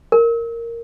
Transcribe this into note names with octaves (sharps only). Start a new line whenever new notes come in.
A#4